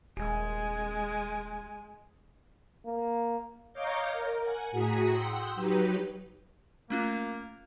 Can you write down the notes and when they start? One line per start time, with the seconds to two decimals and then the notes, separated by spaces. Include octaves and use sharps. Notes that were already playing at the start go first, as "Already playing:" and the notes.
0.17 D#1 G#3 G#5
2.86 A#3
3.73 C#5 D#5 F5 A#5 D6 G6
4.10 A#4
4.42 F#5 G#5
4.71 A2 F#4 G#4 A#5 D#6 B6
5.10 F#5 G5 C6 D#6 E6
5.55 F#3 D#4 G4 B4
6.90 A3 A#3 C#4 F4